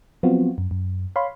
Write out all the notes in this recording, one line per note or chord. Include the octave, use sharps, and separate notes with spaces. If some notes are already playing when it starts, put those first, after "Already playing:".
F3 F#3 B3 C4 F4 F#4
F#2
F#2
C#5 F5 B5 C6